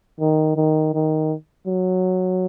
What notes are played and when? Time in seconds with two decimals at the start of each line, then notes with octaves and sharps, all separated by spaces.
0.20 D#3
0.56 D#3
0.95 D#3
1.67 F#3